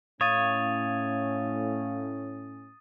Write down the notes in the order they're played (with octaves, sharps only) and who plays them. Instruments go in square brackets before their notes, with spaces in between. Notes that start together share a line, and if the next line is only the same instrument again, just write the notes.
[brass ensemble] A2 C#4 [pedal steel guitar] C#5 [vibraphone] F5 [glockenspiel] D#6 A6 D#7